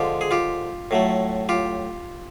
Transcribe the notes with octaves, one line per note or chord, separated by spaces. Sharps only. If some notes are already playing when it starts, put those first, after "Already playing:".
Already playing: D3 F3 G#3 F4 G4
G#4
F4 G4
A2 F#3 A3
F4 G4